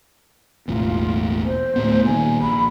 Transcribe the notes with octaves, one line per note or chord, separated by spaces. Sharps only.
E1 A1 E2 F4
C5
D1 A2 B3
A#2 D#3 G#5
A#1 B5